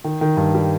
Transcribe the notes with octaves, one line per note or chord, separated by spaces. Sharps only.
D#3
D#3
G2
G3